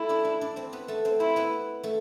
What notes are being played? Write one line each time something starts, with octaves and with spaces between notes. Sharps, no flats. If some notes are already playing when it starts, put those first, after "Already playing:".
Already playing: A3 E4 A4
D4 D5
D4 D5
D4 D5
C4 C5
B3 B4
A3 A4
C4 C5
C4 E4 C5
B3 B4
A3 A4